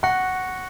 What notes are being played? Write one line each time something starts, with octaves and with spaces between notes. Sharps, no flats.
F#5 C#6 F#6 A#6 C#7